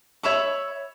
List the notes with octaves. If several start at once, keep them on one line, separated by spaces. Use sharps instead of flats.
C#5 E5 B5 C#6